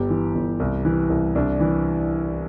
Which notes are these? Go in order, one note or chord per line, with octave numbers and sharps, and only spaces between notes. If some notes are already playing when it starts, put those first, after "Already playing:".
Already playing: G1 G4
E3
G1
C2
E3
C2
C2 D4
E3